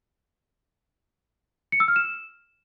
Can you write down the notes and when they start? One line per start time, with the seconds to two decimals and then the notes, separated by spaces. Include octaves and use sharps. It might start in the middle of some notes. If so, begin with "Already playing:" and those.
1.72 C#7
1.80 E6
1.88 F6
1.96 E7